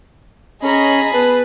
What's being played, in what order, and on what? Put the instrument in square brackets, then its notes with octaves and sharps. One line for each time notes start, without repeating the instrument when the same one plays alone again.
[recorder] C#4 [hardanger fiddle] G#4 B5 [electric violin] D#5 A#5
[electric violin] B3 A5 [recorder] B4